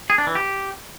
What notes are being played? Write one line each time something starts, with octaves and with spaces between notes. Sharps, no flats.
G#4
D4
E3
G4